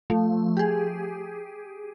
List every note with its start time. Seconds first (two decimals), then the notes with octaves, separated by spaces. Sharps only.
0.10 F3 A3
0.57 G4 G#4